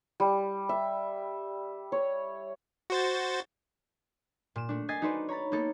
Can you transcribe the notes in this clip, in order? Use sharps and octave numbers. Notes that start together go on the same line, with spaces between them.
G3
E5
C#5
F#4 C5 A6
A#2 E7
A3 D4
D#5 G#5 G#6 A6 B6 C7
D#4 F#4 A4 B4 C5 D5
C#5 A#5 B5 A6
A#3 B3 D#4 A4